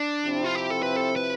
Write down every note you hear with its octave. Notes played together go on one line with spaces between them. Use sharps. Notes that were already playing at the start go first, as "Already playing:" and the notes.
Already playing: D4
C3 F3 C4 E4
F4
G4
A4
B4
A4
B4